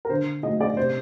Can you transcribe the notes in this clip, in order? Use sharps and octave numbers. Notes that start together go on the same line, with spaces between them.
A#4
D3 C5
F#3 A3 D#4 D#5
D5
C3 C5